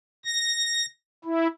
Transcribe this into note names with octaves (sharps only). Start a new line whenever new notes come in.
A#6
E4